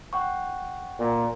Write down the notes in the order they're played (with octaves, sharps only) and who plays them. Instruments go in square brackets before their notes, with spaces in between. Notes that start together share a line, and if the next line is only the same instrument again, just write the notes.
[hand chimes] F#5 G5 C#6
[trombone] A#2